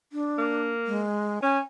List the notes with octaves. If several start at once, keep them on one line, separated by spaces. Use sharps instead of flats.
D4
A#3
G#3
C#4 G#5